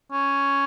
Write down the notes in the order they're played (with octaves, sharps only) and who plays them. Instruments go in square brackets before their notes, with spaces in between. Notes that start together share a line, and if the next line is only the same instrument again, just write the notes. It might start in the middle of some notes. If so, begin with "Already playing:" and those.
[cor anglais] C#4